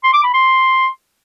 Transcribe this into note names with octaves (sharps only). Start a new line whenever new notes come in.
C6
D6
B5
C6